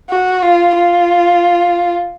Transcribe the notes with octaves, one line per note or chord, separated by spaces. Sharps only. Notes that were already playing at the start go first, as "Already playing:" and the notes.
F#4
F4
F4